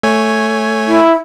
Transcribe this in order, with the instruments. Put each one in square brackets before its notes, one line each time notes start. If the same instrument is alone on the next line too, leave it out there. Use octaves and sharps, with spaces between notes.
[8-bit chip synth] A3 C#5 G#5
[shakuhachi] E4